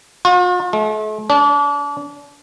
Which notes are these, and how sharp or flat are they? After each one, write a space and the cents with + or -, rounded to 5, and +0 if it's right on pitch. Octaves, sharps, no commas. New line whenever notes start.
F4 +45
A3 -45
D4 -30